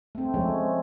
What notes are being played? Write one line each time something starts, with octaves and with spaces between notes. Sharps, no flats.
A3 C4
F3 G#3 A3 C#4